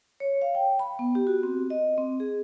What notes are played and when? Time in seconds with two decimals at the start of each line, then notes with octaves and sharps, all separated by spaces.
0.20 C#5
0.42 F5
0.55 G5
0.79 B5
0.99 B3
1.15 G4
1.27 F#4
1.43 C4
1.70 D#5
1.98 C4
2.20 G#4